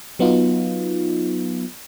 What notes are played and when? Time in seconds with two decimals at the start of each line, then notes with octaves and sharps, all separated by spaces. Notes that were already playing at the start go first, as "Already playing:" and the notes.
0.19 F#3 B3 D#4 F4